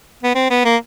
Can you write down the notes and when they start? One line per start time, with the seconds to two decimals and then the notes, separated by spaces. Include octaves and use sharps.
0.23 B3
0.35 C4
0.50 B3
0.65 A#3